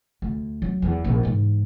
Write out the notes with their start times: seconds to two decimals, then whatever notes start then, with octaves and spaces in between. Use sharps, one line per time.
0.22 D2
0.62 F#3
0.82 E2
1.04 A#1
1.23 G#2 E3